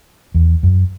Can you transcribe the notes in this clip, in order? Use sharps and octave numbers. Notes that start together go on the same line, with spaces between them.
E2
F#2